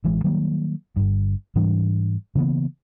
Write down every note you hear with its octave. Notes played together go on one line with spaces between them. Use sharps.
A1 E3 G#3
D#3 F#3 G3 A#3
G1 G2
G#2 E3 G3 D4
C#3 E3 A#3 B3